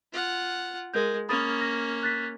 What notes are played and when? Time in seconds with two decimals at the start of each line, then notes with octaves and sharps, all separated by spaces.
0.13 F4 F#5
0.93 G#3 A#4 G6
1.29 A#3 C#4 B5 D#6 A6
1.61 A#6
2.03 F#6 A6 B6